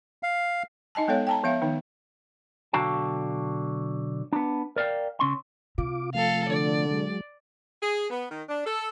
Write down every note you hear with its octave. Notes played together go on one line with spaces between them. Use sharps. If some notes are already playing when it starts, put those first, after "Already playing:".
F5
D#4 D#5 G#5 A5
G#3 B3 A4 C#5 F5
G5 A5 A#5
F3 B3 E5 F5
D#3 B3 D#4
B1 D3 F#4 F5 G5 A5
B3 D4
A#4 D5 F5 G5
C#3 C#4 C6
C3 F4 D6
F3 A3 A4 F5
D3 D5
F#3 G#3
G#4
B3
D#3
D4
A4